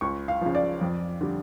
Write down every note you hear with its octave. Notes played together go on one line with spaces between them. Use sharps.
C#2 C#6
F5
C#3 F3
D5
F2
D3 G3